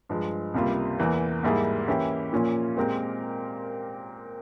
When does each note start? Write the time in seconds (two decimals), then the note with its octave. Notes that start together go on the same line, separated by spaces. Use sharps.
0.09 G2 F3 G#3
0.54 C#2 C3 G3 A#3 F4
0.99 E2 E3 A#3
1.43 G#2 G3 A#3 E4 G#4
1.87 E3 A#3 C#4 E4 G4
2.33 A#2 F3 A#3 C#4 F4
2.76 A#2 G#3 C4 G4 A#4